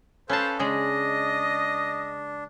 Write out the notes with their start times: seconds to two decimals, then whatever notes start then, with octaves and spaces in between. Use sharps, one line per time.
0.29 C#4 A4 B4 C5 F5 A5
0.59 C#3 G#3 D4 D#5